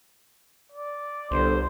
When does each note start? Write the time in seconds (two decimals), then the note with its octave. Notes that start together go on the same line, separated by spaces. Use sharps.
0.72 D5
1.31 G1 C2 C5